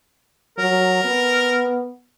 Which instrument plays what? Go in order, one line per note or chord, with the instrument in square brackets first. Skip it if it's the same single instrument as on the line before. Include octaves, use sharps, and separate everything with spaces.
[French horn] F#3 [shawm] A#4
[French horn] B3